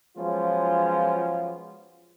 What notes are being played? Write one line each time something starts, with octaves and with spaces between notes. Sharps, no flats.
F3 F#3 G#3 B3 C#4 F4